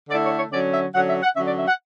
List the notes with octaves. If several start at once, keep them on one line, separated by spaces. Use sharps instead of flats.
D3 A3 E4 D5
C#5
C#5
D3 F#3 C#4 D5
E5
D3 F#3 C#4 F#5
E5
F#5
D3 F#3 C#4 E5
D5
E5
F#5